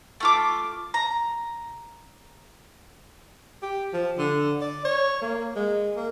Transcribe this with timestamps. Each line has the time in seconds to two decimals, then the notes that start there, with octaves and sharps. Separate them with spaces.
0.20 A3 F4 D6
0.94 A#5
3.62 G4
3.93 F3
4.18 D3
4.61 D5
4.85 C#5
5.22 A#3
5.56 G#3
5.96 A#3